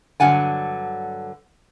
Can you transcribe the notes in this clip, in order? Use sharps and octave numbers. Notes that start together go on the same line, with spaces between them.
G2 D3 F#3 F#5 G#5